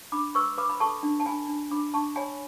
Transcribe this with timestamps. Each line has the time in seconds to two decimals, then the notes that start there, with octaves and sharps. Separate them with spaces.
0.12 D4 B5 D6
0.35 B4 C#6 E6
0.58 B4 B5 D6
0.69 B5
0.80 A4 A5 C#6
1.03 D4
1.20 A5
1.26 D4 G#5 B5
1.48 D4
1.71 D4 B5 D6
1.94 D4 A5 C#6
2.16 C#5 G#5 B5